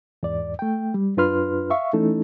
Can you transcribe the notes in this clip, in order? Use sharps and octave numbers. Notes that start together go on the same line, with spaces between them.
E2 G#2 D5
A3 G5
G3
F#2 D4 F4 B4 C6 F6
E5 F5 C#6
E3 A3 C#4 D#4 E4 A4